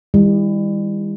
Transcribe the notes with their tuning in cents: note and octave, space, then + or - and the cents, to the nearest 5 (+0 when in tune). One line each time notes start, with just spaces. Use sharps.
D#3 +25 G3 +35 E4 +0